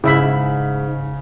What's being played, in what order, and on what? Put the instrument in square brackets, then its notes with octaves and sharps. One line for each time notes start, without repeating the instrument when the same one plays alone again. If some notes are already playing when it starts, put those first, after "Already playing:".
[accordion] G#2 [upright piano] C#3 [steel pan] E4 E5 B5